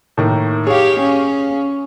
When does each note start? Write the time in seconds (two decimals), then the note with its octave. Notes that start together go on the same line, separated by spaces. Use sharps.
0.17 A2 D#3 A#3
0.67 G4 G#4 C#5 F5
1.00 C#4